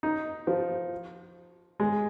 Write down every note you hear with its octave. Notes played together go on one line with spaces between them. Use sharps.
D#4
F3
G#3